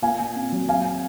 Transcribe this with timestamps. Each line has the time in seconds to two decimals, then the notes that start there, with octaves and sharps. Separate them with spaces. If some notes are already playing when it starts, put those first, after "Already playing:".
0.02 A#2 F5 G#5
0.19 A#2
0.36 C4
0.52 F#3
0.68 C4 F5 G#5